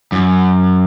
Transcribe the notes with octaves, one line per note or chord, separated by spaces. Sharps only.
F#2